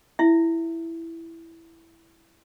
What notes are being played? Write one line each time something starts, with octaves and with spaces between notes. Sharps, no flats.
E4 E5